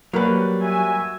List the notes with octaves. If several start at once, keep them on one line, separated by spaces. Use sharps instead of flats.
F#3 G3 A#3 B4
F#4 E5 G#5